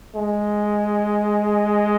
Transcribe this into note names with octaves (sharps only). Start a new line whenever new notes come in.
G#3